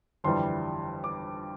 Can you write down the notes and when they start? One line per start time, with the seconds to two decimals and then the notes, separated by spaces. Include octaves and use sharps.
0.24 G1 F2 E3 G3 C6
1.04 D6